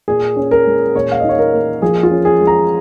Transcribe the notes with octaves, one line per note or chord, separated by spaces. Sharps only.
A#2 G#4
C#4
A#4
G#3
A#2 C#5
F5
D#4 D#5
C#5
A#4
A#3
F3 G#4
F4
C#4
G#4
G#3
A#5